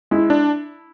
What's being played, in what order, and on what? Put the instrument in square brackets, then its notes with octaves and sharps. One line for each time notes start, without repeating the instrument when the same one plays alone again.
[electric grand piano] G#3 [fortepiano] E4
[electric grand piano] D4